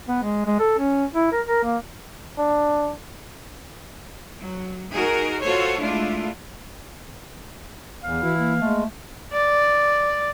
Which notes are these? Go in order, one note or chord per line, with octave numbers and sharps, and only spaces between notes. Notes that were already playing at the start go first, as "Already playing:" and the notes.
B3
G#3
G#3
A4
C#4
E4
A#4
A#4
A#3
D4
F#3
D#4 F#4 G#4 A#4
F4 F#4 A4 C5 C#5
G#3 A3 D4 E4 F4
E2 F5
E3 E4 F#4
A#3
G#3 A3
D5